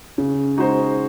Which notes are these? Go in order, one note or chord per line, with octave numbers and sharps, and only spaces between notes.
C#3
G#3 D#4 F#4 C5